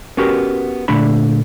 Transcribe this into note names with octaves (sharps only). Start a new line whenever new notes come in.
B3 C#4 F#4 G4 A#4
A#2 D3 A3 D4 B5